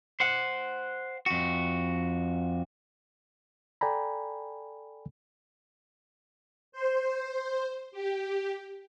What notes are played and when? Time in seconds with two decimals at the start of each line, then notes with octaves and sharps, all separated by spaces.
0.20 C5 F#5
1.26 F2 F#4
3.81 A4 D5 G5 G#5 A#5 B5
6.72 C5
7.92 G4